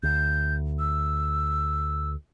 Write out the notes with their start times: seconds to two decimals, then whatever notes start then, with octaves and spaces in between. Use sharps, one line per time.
0.03 D2 G6
0.79 E6